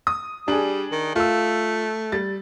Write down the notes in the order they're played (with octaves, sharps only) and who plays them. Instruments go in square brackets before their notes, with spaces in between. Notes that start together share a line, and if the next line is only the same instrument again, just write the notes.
[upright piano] D#6
[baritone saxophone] G3 [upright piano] D4 G#4
[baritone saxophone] D#3
[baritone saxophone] A3 [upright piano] F4 E6
[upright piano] G3 A6